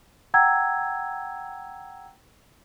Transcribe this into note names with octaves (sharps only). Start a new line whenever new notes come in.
F#5 G5 A#5 E6 G#6